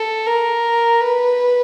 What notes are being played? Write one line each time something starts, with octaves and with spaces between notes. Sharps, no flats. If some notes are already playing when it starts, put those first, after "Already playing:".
Already playing: A4
A#4
B4